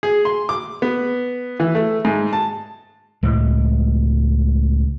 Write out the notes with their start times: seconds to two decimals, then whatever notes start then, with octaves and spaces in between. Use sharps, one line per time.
0.03 G#4
0.25 C6
0.49 D6
0.82 B3
1.60 E3
1.75 A3
2.05 G#2
2.33 A5
3.23 C#2 A2 G#3